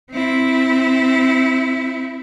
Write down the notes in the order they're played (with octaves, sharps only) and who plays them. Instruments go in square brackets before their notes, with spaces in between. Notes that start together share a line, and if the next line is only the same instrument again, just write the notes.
[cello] C4 E4